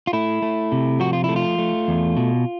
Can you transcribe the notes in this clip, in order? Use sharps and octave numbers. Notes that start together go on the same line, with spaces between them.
F4
A3 E4
A3
C3
F3 F#4
F4
A3 E4
F4
A3
E2
B2